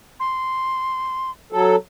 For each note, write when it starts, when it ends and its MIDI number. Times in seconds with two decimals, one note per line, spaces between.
0.20 1.31 84
1.52 1.76 54
1.52 1.76 69